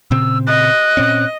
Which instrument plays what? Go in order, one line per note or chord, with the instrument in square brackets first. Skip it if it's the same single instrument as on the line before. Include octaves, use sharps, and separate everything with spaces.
[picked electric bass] A#2 C#3 C4 [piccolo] E6
[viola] D#5 [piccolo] F#6
[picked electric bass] A#2 C4 C#4